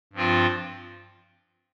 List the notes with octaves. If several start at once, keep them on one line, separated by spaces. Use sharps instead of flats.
G2 F3 C4 F4